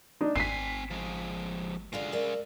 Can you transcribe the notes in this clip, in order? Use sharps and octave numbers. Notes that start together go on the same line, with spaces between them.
D4 D#4
G#1 C4 G#5 B6 C7
F3 G#3
D3 G#3 F4 F#4 F5
A#4 D5 E5